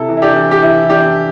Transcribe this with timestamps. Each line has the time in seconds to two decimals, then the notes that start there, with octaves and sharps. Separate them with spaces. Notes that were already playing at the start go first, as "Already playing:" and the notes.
Already playing: C3 E4 A4
0.08 E3
0.17 E4
0.22 D4 G4
0.35 E3
0.51 G4
0.62 E3 E4
0.83 E4
0.90 E3 D4 G4